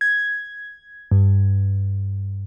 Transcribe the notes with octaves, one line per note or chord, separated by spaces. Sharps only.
G#6
G2